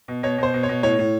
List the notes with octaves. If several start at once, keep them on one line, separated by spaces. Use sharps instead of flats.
B2
B2 C#5
B2 C5
B2
C#5
B2
A2 C#5
A2